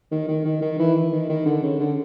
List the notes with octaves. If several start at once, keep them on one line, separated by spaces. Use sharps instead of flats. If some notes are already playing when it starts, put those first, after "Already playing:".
D#3
D#3
D#3
D#3
E3
D#3
D#3
D3
C#3
D3